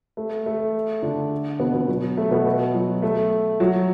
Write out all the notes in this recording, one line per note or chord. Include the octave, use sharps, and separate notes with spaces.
A3
A3
D3 D4
B2 B3
B2 B3
F#3
A3
B2 B3
F#3
A3
F#3